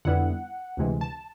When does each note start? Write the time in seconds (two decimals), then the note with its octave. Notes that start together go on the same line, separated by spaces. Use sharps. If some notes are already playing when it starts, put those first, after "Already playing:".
0.05 F2 D3 G3 B3 E4 F#5
0.77 D2 C3 E3 G#3
1.01 A5